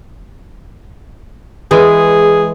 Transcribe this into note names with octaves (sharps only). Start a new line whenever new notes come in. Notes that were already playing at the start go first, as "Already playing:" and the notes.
E3 G#3 G#4